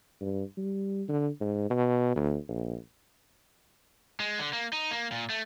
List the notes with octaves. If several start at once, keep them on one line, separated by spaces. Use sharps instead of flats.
G2
G3
D3
G#2
B2
D2
A#1
G#3
D3
A#3
D#4
A#3
A#2
A3